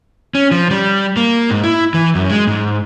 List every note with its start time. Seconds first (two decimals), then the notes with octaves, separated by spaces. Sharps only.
0.35 C#4
0.51 F3
0.71 G3
1.17 A#3
1.50 G#2
1.63 E4
1.94 E3
2.15 F#2
2.30 G#3
2.47 G#2